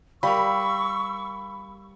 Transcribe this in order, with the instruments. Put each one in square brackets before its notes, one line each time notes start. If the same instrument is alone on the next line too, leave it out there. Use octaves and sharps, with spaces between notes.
[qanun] G3 A#4 [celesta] F5 [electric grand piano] B5 [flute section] C#6 E6